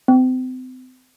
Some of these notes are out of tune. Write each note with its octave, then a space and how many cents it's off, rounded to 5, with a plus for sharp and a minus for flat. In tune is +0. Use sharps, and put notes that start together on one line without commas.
C4 -35